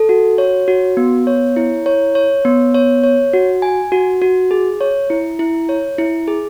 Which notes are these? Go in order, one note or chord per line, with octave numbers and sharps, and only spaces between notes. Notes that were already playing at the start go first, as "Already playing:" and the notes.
Already playing: A4
F#4
C#5
F#4
B3
C#5
E4
C#5
C#5
B3
C#5
C#5
F#4
G#5
F#4
F#4
G#4
C#5
E4
E4
C#5
E4
G#4